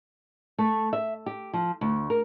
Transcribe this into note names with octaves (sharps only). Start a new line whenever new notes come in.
A3
E5
G4
F3
D2
A#4